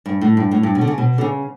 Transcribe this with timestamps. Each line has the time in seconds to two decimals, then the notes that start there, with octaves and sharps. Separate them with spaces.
0.06 G2
0.21 A2
0.37 G2
0.51 A2
0.63 G2
0.75 B2
0.81 D3
0.87 C#3
0.98 B2
1.18 D3
1.21 C#3